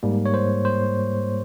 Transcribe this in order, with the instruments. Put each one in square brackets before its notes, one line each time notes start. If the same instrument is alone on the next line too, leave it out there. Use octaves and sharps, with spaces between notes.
[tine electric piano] G#2 G3 A#3
C#5
C5
C5